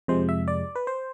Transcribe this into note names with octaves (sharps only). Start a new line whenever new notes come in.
F2 C3 F3 G#3 C5
E5
D5
B4
C5